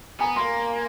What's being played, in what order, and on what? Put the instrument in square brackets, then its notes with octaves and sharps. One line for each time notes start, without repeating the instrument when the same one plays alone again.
[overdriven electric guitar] B3 [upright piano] G#5 A#5
[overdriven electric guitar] A#3 [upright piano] A#5 C6